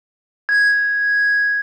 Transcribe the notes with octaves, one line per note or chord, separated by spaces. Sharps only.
G#6